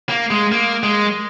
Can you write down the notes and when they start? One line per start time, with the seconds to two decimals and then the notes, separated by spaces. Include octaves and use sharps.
0.09 A#3
0.31 G#3
0.52 A#3
0.84 G#3